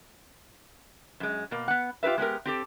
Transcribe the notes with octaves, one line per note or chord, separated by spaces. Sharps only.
F#2 G#3
B2 A#3
B3 F#5
F4 G4 A#4 B4 E5
G#3 B3 G4 A#4
C4 G4 A4